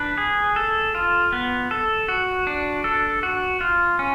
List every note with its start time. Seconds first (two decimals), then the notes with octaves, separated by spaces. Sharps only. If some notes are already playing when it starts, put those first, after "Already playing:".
Already playing: D4 B4
0.18 G#4
0.56 A4
0.95 F4
1.33 B3
1.71 A4
2.08 F#4
2.47 D4
2.84 A4
3.23 F#4
3.61 F4
3.99 C#4